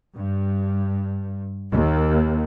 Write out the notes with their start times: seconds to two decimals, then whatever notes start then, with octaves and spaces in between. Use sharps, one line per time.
0.16 G2
1.71 D#2